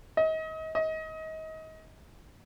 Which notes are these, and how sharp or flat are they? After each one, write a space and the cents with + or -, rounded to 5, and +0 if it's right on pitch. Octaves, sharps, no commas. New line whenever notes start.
D#5 +35
D#5 +30